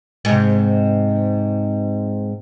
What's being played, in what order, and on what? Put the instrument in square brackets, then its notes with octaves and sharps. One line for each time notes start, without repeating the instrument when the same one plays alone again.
[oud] G#2 C3